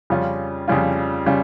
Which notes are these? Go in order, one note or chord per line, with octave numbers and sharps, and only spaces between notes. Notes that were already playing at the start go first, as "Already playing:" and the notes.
F2 C#3 G3 C#4 F4
F2 C#3 G3 C#4 F4
C#3 G3 C#4 F4